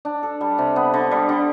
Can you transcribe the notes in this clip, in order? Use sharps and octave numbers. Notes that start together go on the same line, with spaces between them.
D4
A4
G3
C3
B3
D3
G3
D3